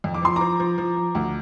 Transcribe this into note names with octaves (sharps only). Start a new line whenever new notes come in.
F2
D6
F3 C6
F3 A#5 D6
F3
F3
F3
D2